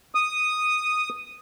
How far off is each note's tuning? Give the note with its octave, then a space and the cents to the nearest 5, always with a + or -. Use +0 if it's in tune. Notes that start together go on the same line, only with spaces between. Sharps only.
D#6 -5